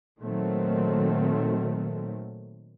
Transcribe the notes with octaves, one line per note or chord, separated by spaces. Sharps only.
A#2 D#3 F#3 A3 C4